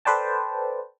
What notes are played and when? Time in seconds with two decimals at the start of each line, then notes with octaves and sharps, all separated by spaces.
0.05 A4 B4 C5 D5 G5 A5